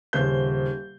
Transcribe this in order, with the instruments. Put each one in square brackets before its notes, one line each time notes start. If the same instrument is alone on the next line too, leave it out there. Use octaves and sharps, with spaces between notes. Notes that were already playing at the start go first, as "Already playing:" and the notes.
[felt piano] D#1 C#3 C5 G6